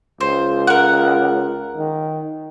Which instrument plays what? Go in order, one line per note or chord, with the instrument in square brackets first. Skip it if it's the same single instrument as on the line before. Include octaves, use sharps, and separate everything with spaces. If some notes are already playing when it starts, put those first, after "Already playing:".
[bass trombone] C#2 [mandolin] C5
[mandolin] A#4 F#5
[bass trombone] D#3